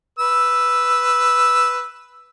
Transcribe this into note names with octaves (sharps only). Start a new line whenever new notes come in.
B4 E6